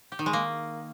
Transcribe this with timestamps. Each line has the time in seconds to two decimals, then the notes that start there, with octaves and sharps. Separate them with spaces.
0.12 G4
0.19 D#3
0.26 G#3
0.33 A#3